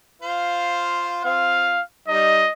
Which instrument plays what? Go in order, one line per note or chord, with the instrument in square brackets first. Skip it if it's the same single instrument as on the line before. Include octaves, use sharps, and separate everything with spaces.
[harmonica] F4 C5 F5
[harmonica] C4 F4 [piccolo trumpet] F5
[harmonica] G3 D#4 [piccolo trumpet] D#5